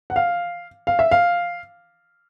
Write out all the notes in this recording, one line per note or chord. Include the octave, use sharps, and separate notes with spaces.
F#5
F5
F5
E5
F5